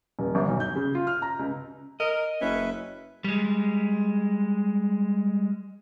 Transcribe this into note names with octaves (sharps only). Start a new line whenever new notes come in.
D#1
G1
B1
G6
C#3
F4
F6
A#5
C#2
A#4 D#5
F#1 C#4 B4 E5
G3 G#3